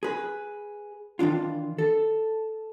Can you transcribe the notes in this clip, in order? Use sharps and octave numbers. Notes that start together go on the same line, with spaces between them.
G#4 B4
D#3 E3 D4 F4
A4